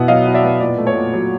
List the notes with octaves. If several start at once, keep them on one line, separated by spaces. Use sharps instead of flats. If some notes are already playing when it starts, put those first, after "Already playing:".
Already playing: B2 B3 E4 F#5
F#3 D#5 F5
E4
D5 E5
B3
A#2 D5
A3
C#5
A#2
F#3